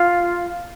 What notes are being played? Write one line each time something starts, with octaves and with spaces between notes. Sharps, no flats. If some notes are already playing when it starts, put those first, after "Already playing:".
Already playing: F4